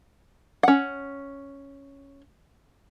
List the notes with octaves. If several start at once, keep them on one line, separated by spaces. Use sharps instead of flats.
C#4 F#5